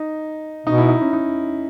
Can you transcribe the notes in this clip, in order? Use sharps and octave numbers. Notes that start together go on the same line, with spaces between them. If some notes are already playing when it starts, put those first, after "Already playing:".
Already playing: D#4
B2 D#4
E4
D#4
C#4
D#4